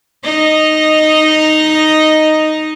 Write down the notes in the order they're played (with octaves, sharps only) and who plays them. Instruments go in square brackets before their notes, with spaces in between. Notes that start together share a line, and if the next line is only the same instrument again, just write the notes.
[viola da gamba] D#4 D#5